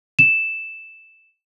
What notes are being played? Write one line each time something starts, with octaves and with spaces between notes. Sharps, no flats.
E7